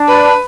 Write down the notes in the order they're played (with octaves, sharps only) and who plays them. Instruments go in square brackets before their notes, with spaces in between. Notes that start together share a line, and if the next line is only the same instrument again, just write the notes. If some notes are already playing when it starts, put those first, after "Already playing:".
Already playing: [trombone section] D4
[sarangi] B4